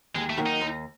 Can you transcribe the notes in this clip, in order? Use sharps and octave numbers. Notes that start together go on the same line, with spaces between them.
D#2 G#3
A3
D#3 F#3 A#3
D#4
D#2